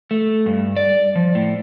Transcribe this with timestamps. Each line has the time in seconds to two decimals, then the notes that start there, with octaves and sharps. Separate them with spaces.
0.11 A3
0.46 G2
0.76 D5
1.15 F3
1.35 A2